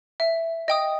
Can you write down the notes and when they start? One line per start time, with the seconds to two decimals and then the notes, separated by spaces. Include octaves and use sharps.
0.20 E5
0.68 D#5 G5 D#6